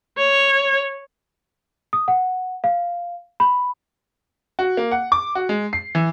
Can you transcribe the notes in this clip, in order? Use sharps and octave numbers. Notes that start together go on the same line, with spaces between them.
C#5
D#6
F#5
F5
B5
F#4
A#3
F#5
D6
F#4
G#3
C7
E3